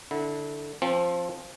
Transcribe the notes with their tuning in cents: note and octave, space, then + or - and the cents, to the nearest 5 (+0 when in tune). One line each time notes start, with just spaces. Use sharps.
D3 +0 E4 -25
F3 +0 C4 +30